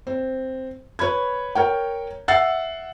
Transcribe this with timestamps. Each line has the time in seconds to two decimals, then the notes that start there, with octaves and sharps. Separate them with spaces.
0.07 C4
0.99 B4 C#5 B5 G#6
1.55 A#4 C#5 G5
2.28 E5 F#5 E6 A6 C7